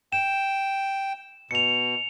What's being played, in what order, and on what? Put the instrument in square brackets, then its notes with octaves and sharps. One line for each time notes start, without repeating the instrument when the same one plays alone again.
[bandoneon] G5 [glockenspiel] E7
[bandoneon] B2 [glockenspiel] C#7 F7